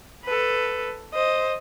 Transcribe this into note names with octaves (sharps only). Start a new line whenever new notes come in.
A4 B4
C5 D#5